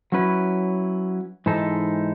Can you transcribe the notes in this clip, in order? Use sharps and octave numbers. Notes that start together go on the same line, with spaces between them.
F#3 C#4 E4 B4
G#2 E3 G#3 D#4 A4